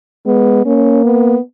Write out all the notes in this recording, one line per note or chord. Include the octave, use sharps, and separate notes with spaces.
G#3 B3
A#3 C#4
B3